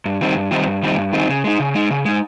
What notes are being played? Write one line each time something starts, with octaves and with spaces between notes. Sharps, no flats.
G2
D#3 G3 C4 D#4
G2
D#3 G3 C4 D#4
G2
D#3 G3 C4 D#4
G2
D#3 G3 C4 D#4
C#3
G#3 D#4
C#3
G#3 D#4
C#3
G#3 D#4